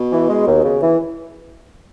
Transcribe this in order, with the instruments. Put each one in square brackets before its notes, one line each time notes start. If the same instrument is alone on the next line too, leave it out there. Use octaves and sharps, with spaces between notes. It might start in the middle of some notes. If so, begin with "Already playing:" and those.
Already playing: [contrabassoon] B2
[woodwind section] E3
G#3
D#2
C#3
E3